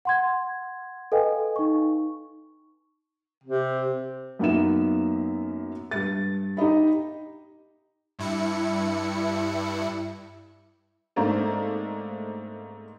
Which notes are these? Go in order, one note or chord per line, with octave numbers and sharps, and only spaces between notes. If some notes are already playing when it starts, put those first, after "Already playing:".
F#5 C6 G#6
A4 B4 D#5 F5 G5 G#5
D#4 C#6
C3
F#2 A#3 B3 D#4 E5 E7
G2 A6
D#4 G4 D#5 B5
G2 E4 C#7
G#2 A3 A#3 C4 D4